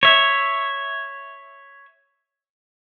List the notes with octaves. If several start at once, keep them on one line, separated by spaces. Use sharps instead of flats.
C#5 E5